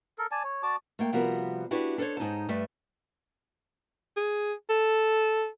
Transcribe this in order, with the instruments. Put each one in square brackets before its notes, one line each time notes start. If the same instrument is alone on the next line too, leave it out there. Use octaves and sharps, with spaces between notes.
[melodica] A4 A#4
D5 G#5 A5
C#5
F#4 D5 A5 D6
[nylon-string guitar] A3 A#3 G5
C3 F3 G3 B3 F#4 A#4
D4 E4 F#4 G4 B4 D5
D4 A4 A#4 C5 C#5
G#2 D#4 C#5 A5
G2 A3 B4 E5
[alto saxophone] G#4
A4